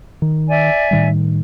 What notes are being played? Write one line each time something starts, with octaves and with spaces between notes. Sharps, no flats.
D#3
D5 E5 G#5
A2 D#3 G3